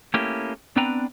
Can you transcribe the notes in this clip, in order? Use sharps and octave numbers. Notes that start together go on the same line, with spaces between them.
A3 A#3 C#4 E4 G4
B3 C4 D4 B4 G5 A#5